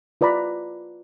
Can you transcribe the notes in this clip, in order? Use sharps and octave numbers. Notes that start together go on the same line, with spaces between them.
F4 B4 D5 A#5 B5